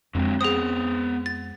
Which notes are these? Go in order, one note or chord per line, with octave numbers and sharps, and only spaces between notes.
F2 D3 F#3 G#3 C4
B3 G#4 C5 D#6
A6